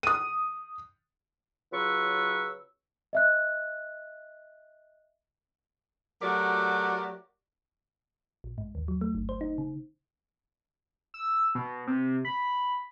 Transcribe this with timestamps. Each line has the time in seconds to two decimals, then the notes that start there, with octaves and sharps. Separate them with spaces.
0.03 D#6 D#7
1.72 C#3 F#3 F4 B4 C#6 E6
3.13 D#5 E5 F#6
6.22 F#3 A3 F#4 G4 A#4 D5
8.44 A#1
8.58 G#2
8.75 D#2
8.88 F#3
9.01 A3
9.15 G1
9.29 C5
9.41 D#4
9.58 C#3
11.14 E6
11.55 B2
11.87 C3
12.25 B5